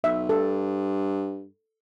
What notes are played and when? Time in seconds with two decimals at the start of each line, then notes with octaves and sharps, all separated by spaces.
0.04 B1 E5
0.29 G2 A4